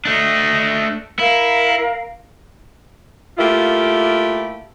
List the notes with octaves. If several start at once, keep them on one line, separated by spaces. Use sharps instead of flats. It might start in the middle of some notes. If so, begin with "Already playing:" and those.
A3 D4 D#5
E4 A#4 F5
A3 A#3 E4 F4 G4